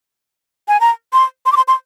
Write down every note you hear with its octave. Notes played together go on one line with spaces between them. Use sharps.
G#5
A#5
C6
C6
D6
C6
C6